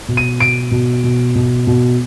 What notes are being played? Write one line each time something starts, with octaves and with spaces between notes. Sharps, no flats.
B2
D#7
B2 D7
B2
B2
B2
B2